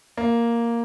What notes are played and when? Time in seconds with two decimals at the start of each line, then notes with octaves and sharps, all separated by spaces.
0.17 A#3